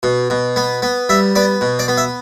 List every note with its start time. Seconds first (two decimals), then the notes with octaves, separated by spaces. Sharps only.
0.03 B2
0.30 B2
0.56 B3
0.82 B3
1.09 G3 E5
1.35 B3 D5
1.61 B2
1.79 D5
1.88 B3
1.97 E5